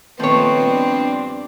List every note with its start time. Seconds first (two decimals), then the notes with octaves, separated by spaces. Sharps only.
0.20 A#2 D#3 F3 A3 B3 C4 C#5
0.57 G2 D4